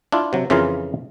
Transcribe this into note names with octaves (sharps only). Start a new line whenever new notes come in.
D4 E4 F4
C3 F#3
F2 C#3 E3 F4 A#4 F5